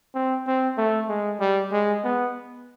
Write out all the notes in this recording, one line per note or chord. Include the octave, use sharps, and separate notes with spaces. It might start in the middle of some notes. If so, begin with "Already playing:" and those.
C4
C4
A3
G#3
G3
G#3
B3